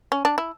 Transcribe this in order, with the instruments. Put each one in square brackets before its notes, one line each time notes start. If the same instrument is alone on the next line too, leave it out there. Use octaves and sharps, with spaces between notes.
[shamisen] C#4
D4
E4